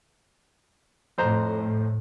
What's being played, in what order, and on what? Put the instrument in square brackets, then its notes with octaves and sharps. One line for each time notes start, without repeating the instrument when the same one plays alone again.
[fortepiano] F2 C5 A#5 [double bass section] A2